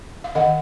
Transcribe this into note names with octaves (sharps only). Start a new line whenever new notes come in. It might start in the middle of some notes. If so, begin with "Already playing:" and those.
F5
D#3 D#5 F#5